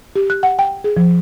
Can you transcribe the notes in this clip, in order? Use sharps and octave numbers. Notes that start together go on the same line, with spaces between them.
G4
F#6
F#5
G5
G#4
F3